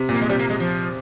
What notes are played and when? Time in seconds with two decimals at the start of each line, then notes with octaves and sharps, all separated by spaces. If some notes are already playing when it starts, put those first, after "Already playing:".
Already playing: C3
0.09 A#2
0.14 A#3
0.21 G#3
0.29 C3 G3
0.39 A#3
0.50 G#3
0.60 F3